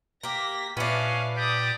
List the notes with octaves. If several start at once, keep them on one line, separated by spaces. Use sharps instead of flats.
A#3 G4 A#6 B6
A#2 B3 C#4 D4 E5 F5
G4 D5 D#6